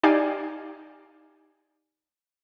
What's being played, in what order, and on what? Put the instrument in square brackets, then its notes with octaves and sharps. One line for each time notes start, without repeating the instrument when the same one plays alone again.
[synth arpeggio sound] D#4 G4 D5 F5 G#5